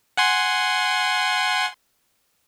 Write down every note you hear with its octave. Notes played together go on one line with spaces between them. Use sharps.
F#5 G#5 C6